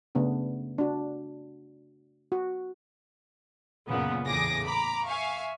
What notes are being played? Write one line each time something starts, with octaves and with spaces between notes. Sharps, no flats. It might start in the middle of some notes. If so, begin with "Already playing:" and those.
C#3 A3 B3 D4
D4 F#4
F#4
F#2 A#2 C#3 B3
E2 A2 C#3 G#4 D6 A#6
A#5 B5 D6
E5 F5 G#5 C#6